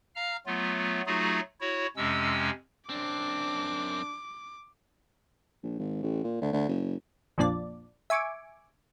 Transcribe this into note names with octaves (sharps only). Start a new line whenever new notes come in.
F5 A#5 F6
F#3 A3 B3 F4
F#3 A3 D#4 F4 F#4 G#4
E4 F#4 C#5
F2 C3 G#3 C#4 E6
F#2 C4 D4 D6
A#1
G#1
A1
A#2
D2
D2
F#1
A#1 F2 A#2 D4 D5
E5 G#5 C#6 D6